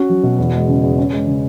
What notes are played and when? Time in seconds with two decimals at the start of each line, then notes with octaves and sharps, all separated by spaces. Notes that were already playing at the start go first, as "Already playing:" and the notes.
Already playing: C#4 F#4
0.09 F#3
0.23 B2
0.38 E2
0.53 G#3
0.68 C#3
0.83 E2
0.98 C#4
1.13 G#3
1.27 C#3